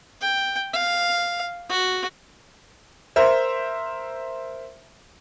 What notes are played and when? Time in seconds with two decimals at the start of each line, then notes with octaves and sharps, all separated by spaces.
0.21 G5
0.73 F5
1.69 F#4
3.16 A#4 C5 E5